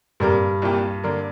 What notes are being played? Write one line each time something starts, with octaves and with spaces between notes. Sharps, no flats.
G2 C3 A#3 D4 A#4
C2 A#2 A#3 G4
D3 A#3 D4 A#4